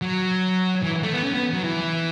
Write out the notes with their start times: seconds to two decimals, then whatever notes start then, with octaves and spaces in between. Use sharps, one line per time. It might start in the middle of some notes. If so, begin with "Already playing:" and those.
0.02 F#3
0.83 E3
1.03 A3
1.13 B3
1.24 C#4
1.34 B3
1.53 F#3
1.64 E3